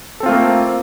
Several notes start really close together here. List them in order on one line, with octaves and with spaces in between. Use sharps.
A4 C4 F4 A3 A#3